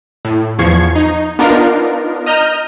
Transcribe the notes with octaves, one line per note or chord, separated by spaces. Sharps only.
A2
E2 F3 C#6 G#6 C7
D#4
B3 D4 D#4 F4 A#4
D#5 A#5 F6 G6 D#7